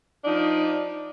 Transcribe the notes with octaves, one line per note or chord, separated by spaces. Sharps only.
F3 D4 D#4